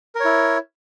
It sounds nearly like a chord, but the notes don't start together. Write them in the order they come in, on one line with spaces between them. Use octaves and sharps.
A#4 C#5 E4